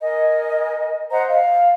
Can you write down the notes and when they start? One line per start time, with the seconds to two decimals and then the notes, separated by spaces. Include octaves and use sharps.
0.01 A#4 D#5 G#5
1.10 C5 D#5 F#5 A#5
1.27 F5